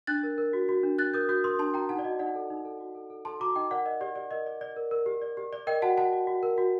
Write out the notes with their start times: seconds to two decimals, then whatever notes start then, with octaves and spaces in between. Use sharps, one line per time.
0.07 D4 F#6 A6
0.23 A#4
0.38 A#4
0.53 F#4
0.69 F#4
0.83 D4
0.98 D4 F#6 A6
1.13 A#4 D#6 G6
1.29 F#4 D#6 G6
1.44 A#4 C6 D#6
1.59 D4 A5 C6
1.74 F#4 G5 A#5
1.89 D#4 F#5 A5
1.99 D5
2.04 F#4 D#5
2.19 D#4 D5 F#5
2.35 A4
2.50 D#4
2.65 A4
2.80 F#4
2.95 A4
3.10 A4
3.25 A4 A5 C6
3.40 F#4 A#5 D6
3.55 D#4 D#5 G5
3.71 A#4 D5 F#5
3.85 A#4 D#5
4.01 G4 D5
4.16 G4 D5
4.31 A#4 D#5
4.46 D5
4.61 D5
4.76 A#4
4.91 A#4
5.06 G4
5.22 D5
5.37 G4
5.53 D5
5.67 A#4 D#5 G5
5.82 F#4 F#5 A5
5.97 F#4 F#5 A5
6.13 F#4
6.27 F#4
6.43 A#4
6.58 F#4